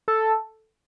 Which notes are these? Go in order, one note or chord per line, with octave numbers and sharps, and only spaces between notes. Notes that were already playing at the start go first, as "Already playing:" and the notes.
A4